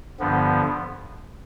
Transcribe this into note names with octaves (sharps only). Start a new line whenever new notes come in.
G2 D3 F3 B3